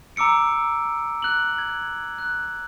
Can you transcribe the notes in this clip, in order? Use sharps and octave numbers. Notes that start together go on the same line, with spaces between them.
A#5 D6 E6 C#7 D7
F#6 F#7
G#6
F#6